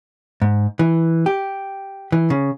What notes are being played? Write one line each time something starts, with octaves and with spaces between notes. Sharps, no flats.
G#2
E3
G4
E3
C#3